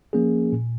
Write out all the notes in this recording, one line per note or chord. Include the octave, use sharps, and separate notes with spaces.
F3 A#3 C#4 G#4
A#2